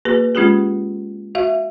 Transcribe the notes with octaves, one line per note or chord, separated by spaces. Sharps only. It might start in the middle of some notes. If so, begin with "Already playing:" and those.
A#3 F#4 G#4 B4
G#3 C#4 F4 G4 G#4
F#4 E5 F5